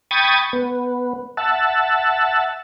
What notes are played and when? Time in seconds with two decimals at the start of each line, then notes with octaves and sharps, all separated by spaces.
0.11 G5 B5 C#6 D#6 G#6 A6
0.53 B3
1.37 E5 F#5 A5